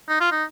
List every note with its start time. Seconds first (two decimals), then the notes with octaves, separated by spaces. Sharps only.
0.09 D#4
0.20 F4
0.32 D#4